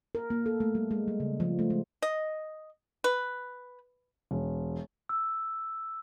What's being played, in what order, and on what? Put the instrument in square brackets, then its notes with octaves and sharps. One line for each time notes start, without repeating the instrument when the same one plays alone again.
[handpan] A#4
A#3
A4
A3
G3
G#3
G3
C#3
F3
A3
G#3
[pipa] D#5
B4
[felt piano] E1
[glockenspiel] E6